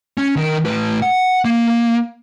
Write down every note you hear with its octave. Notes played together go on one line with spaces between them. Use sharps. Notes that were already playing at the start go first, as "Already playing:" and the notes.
C#4
D#3 A#4
A2 B4
F#5
A#3